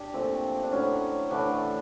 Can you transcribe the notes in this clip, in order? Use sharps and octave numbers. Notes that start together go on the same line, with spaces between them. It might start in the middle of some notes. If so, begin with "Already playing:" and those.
Already playing: D4 G4
A#2 F3 A3 C4
D4
A2 F#3 A3 C#4
A2 D3 E3 A3 D4